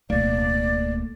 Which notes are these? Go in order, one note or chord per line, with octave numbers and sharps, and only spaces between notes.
D1 B2 A3 A#3 D5